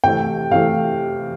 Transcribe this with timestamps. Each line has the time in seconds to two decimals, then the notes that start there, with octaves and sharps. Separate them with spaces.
0.04 C3 E3 A3 G5
0.51 C3 E3 A3 F5